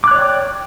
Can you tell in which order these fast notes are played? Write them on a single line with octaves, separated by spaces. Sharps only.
D6 F#6 C#5 D5 G5